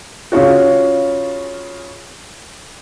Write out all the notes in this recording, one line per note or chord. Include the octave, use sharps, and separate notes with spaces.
C#3 C#4 F4 F#4